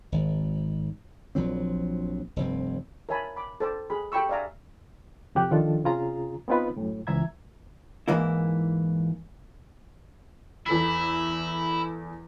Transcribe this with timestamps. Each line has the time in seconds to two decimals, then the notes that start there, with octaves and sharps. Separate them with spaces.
0.12 G#1
1.35 A#1 F3 F#3 C4
2.36 F1 G2 C4
3.09 A#4 C#5 E5 G#5 A5 B5
3.36 B5 D6
3.60 A4 C5 A5 D6
3.90 G#4 B5
4.12 G4 A4 G5 B5 C#6 E6
4.29 D5 E5 F5 G#5 A#5
5.35 F2 C3 G4 F#6
5.51 D#3 F3 D4 F4 A4
5.84 C3 C#4 F4 G#4 A#5
6.48 B3 C4 D#4 F4 B4
6.76 F#2 A2
7.07 C#2 E3 E5 A#5 G#6
8.08 G#2 E3 A#3 E4
10.66 E2 E4 A4 B6